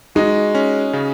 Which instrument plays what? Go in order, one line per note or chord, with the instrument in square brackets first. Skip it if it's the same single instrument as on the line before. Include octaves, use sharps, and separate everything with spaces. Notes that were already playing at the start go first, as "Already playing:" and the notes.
[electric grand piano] G#3 [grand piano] D#4 F#4
[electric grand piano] C#4
C#3